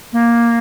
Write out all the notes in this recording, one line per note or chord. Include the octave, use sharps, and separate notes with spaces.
A#3